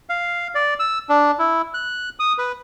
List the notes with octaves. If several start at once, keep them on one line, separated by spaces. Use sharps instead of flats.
F5
D5
E6
D4
E4
F#6
D#6
B4